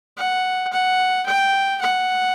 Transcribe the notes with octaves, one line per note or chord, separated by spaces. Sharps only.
F#5
F#5
G5
F#5